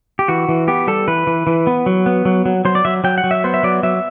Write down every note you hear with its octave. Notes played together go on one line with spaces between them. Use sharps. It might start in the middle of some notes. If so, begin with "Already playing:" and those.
G4
E3 F#4
E3
B3 G4
G3 A4
E3 B4
E3
E3
B3
F#3
B3
F#3
F#3
F#3 C5
D5
F#3 E5
F#3 G5
F#5
F#3
E5
B3 C5
E5
F#3 D5
F#3 E5